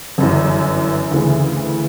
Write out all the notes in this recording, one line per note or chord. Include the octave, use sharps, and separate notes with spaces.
G1 F#2 E3
D2 C#3 E3